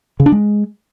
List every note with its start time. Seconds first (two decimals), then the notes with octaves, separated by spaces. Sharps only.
0.20 C#3
0.26 D4
0.32 G#3